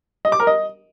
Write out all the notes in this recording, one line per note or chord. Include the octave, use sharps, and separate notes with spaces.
D#5
D6
A#4
D#5